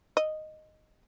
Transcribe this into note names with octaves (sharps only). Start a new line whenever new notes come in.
D#5